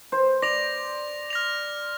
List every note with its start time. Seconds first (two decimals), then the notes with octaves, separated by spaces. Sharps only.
0.12 C5
0.42 D5 A#6 F7
1.30 F6 A#6 F7